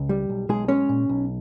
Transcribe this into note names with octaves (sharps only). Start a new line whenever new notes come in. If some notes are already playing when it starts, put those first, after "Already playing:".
Already playing: C#2
G3
B1
B1 G#3 G#4
G#3 C#4 C#5
A#2
B1